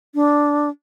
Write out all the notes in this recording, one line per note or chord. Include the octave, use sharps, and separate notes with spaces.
D4